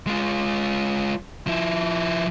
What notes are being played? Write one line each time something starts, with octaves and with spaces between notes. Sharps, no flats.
G#3 F4
F3 E4